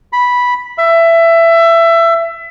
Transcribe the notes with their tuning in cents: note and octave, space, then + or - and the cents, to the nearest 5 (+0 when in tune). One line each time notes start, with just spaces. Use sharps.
B5 -5
E5 +20